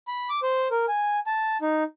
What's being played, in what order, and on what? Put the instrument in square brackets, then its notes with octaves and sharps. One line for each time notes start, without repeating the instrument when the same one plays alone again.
[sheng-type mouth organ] B5
D6
C5
A#4
G#5
A5
D#4